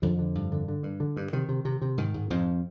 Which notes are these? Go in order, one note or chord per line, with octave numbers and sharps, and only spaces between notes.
F2 D3 F3
D3
G2
D3
D3
G2
D3
G2
C3 D#3
C3
C3
C3
G#2 D#3
G#2
F2 G#2 F3